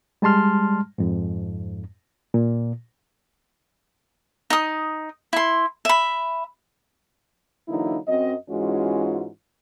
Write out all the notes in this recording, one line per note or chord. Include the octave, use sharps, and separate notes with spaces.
G3 G#3 A5 C6 F6
F2 G#2
A#2
D#4 D#6
E4 C6
E5 B5
D3 E3 F#3 A#3 D#4 E4
F#2 F#3 C4 D#5
G#2 E3 G#3 C#4 F4 F#4